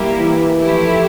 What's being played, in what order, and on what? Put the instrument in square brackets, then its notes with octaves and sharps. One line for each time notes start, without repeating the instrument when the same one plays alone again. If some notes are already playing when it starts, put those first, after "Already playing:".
Already playing: [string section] G3 A#3 E4 G4
[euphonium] E3
[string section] F3 A3 E4 G4